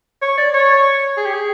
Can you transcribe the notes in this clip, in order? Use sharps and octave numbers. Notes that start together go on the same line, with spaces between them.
C#5
D5
C#5
G#4
G4
G#4